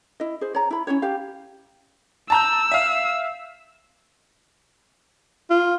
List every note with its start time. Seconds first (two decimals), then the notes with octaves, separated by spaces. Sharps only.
0.20 E4 D#5
0.41 G#4 C5
0.55 C#5 A#5
0.71 E4 B5
0.87 C#4 E4 F#4 C#5
1.02 G4 F5
2.30 A5 A#5 E6 G6
2.72 E5 F5
5.50 F4